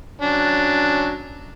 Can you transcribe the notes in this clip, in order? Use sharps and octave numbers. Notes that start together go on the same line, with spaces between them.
F#3 C#4 D4